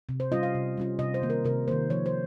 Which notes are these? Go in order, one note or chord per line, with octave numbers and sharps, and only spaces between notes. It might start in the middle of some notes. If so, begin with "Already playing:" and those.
C3
C5
G3 C#4 F4 D#5
F5
C3
G3 C#4 F4
C3 D#5
C5
D#3 A#3
A#4
C3 A#4
D#3 A#3 C5
F3 C#5
C5